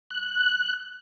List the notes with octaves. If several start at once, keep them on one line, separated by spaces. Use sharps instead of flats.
F#6